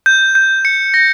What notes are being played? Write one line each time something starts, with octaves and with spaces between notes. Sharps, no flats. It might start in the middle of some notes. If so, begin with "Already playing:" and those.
G6
G6
C#7
A#6